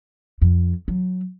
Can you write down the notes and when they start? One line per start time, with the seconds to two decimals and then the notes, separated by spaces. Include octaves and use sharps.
0.42 F2
0.88 F#3